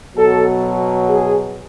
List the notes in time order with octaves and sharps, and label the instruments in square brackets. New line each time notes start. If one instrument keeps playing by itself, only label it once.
[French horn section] B2 F#3 A4
G#4